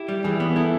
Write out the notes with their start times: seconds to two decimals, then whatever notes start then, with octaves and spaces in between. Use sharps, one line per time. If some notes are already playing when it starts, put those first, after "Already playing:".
Already playing: E4 G4
0.08 G3
0.24 E3 G#4
0.40 B3
0.56 E4 A4